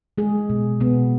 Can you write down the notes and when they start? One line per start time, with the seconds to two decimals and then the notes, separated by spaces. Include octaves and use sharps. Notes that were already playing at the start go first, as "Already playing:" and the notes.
0.18 G#3 G#4
0.50 B2
0.80 B2 B3